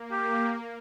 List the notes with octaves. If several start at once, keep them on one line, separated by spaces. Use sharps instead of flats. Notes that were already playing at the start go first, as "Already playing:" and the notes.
Already playing: A#3
G4